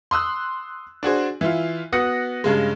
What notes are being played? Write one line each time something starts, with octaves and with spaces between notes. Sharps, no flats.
C6 D#6 E6 F#6
D4 F#4 G#4 C5
E3 E4 F4
B3 F#4 D#6 F#6 A#6 C#7
G2 C#3 G#3